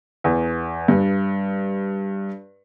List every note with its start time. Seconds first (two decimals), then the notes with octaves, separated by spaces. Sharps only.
0.24 E2
0.88 G2